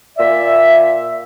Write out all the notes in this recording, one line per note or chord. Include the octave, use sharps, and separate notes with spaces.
A#2 D5 E5